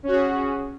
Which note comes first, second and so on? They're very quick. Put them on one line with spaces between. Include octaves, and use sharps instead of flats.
C#4 F#4 G#4